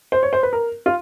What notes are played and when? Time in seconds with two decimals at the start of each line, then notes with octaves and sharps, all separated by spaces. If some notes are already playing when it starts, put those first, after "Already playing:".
0.12 C5
0.23 C#5
0.33 C5
0.43 B4
0.53 A#4
0.86 F4